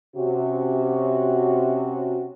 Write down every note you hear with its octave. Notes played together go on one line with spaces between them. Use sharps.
C3 C#4 F#4